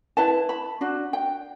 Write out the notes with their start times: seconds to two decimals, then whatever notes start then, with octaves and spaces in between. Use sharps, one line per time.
0.17 E4 B4 A5
0.49 B5
0.81 D4 F#4
1.13 G5